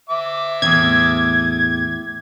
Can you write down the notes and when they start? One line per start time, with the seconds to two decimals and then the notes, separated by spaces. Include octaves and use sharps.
0.09 E5 D6
0.62 E2 A2 C3 G#6